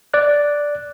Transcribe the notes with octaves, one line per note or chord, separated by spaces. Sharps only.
D5 F#6